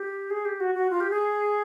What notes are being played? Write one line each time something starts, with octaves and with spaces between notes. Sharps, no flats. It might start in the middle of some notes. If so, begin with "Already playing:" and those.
Already playing: G4
G#4
G4
F#4
F#4
F4
G4
G#4